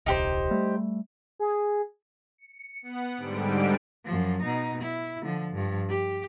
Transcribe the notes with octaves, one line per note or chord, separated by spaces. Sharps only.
D#1 C2 D#4 G4 C5
G3 A3
G#4
C#7
B3 F#5
G#2 D3 G3 D7
F#2 F3
B2 D#4
E4
D3 F3
G2 F3
G4